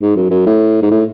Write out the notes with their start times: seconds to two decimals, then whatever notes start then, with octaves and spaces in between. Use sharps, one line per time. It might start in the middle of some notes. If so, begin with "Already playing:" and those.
0.02 G#2
0.16 F#2
0.31 F#2
0.46 A2
0.82 G#2
0.91 A2